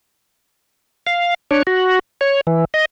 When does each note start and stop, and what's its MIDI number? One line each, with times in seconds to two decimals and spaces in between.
1.07 1.34 77
1.51 1.63 62
1.51 1.63 73
1.67 1.99 66
2.21 2.41 73
2.47 2.65 52
2.74 2.85 75